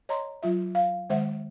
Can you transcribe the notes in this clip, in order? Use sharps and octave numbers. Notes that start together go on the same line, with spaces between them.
C#5 D#5 A#5 C6
F#3 F4 E5
F5
D#3 G#3 C5 E5 F#5